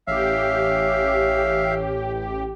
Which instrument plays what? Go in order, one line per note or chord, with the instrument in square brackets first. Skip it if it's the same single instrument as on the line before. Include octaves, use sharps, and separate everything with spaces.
[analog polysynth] A1 G4 [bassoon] C#4 [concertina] E5 F5